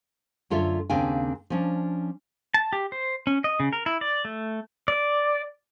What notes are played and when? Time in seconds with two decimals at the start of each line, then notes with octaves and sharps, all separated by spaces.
0.50 F#2 D3 F4 A4 C#5 E5
0.90 D#2 C#3 C4 D4 F5 G#5
1.50 F3 C#4 D4
2.54 A5
2.73 G4
2.92 C5
3.27 C#4
3.44 D#5
3.60 C#3
3.73 A#4
3.86 E4
4.01 D5
4.25 A3
4.88 D5